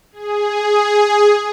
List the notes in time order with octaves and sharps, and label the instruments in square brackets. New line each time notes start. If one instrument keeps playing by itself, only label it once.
[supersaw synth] G#4